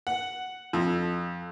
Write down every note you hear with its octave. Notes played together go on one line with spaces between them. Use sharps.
F#5
F2